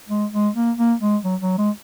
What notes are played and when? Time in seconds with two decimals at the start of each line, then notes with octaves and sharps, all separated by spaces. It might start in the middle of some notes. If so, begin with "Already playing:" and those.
0.09 G#3
0.33 G#3
0.55 A#3
0.78 A#3
1.00 G#3
1.24 F#3
1.42 F#3
1.58 G#3